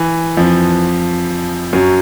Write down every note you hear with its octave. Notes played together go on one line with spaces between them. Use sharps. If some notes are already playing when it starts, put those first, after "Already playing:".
Already playing: E3
F2 F3
F#2 F#3